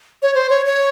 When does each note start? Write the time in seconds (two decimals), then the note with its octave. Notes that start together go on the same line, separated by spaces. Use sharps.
0.22 C#5
0.35 C5
0.50 C#5
0.66 C#5